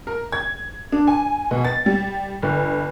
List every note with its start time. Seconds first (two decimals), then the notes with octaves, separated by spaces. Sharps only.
0.07 A#4
0.32 G#6
0.92 D4
1.07 G#5
1.51 B2
1.65 A6
1.86 G3
2.42 G1